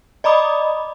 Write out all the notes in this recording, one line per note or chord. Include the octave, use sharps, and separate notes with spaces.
D5 D#5 A#5 B5 D6 D#6